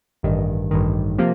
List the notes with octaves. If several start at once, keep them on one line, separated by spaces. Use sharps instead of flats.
A1 G2 D#3
A1 G2 D#3
C3 F3 A#3